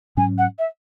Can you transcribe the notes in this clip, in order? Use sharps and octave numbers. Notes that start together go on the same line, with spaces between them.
G#2 F#3 C#4 G#5
F#5
E5